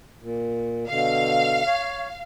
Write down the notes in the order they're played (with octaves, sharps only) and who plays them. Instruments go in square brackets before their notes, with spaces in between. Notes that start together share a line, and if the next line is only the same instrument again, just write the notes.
[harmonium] A#2
[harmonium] B2 D3 [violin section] F5
[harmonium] C#5